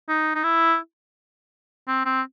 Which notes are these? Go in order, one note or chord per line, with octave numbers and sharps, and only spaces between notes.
D#4
D#4
E4
C4
C4